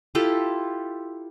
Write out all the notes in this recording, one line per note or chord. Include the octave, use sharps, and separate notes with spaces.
E4 F4 G4 A4